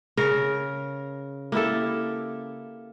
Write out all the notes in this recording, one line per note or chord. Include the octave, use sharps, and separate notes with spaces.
C#3 A#4
A#3 E4 G4 A4